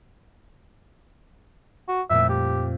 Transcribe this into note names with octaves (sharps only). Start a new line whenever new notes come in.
F#4
F2 A#2 A3 E5
G4